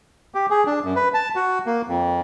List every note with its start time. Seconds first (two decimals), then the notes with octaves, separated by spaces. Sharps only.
0.35 G4
0.50 G#4
0.66 D4
0.85 F#2
0.96 B4
1.14 A5
1.36 F#4
1.66 A#3
1.88 F2